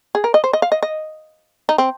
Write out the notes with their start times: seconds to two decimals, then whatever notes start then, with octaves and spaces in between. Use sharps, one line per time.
0.15 G#4
0.24 A#4
0.34 D#5
0.44 C5
0.53 D#5
0.62 F5
0.72 D#5
0.83 D#5
1.69 D#4
1.78 C4